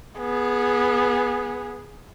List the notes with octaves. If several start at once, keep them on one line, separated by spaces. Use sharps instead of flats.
B3 G#4